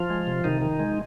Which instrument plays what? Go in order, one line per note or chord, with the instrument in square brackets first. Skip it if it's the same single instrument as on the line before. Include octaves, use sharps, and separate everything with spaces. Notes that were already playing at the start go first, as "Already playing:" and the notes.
Already playing: [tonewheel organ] F3 F4
G#3
C3
C3 D#3 D#4
D#3
G#3